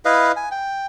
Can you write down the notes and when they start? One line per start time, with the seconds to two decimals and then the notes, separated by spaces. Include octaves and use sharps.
0.05 E4 B4 D#5 F5
0.36 G#5
0.51 G5